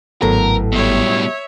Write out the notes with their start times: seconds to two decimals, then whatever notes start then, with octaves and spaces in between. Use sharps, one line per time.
0.22 G#1 A2 F#3 B3 A4 A#4 A#5
0.72 B2 G3 C#5 E5